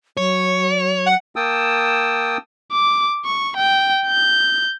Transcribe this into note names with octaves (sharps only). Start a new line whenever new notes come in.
F#3 C#5
F#5
A#3 G5 A5 D#6 E6
D6
C#6
G5
G6